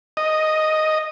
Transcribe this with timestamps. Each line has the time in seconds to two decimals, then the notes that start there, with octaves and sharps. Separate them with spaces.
0.17 D#5